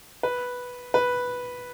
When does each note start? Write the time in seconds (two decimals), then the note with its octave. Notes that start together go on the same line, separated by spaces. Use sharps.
0.23 B4
0.94 B4